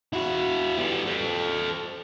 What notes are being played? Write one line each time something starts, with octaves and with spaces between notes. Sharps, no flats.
E4 F#4
G3 B3
A4 C5